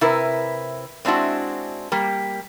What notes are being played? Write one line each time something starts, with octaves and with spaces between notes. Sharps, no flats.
C3 E4 A#4 B4
G#3 C4 D4 E4 F#4
G3 A#3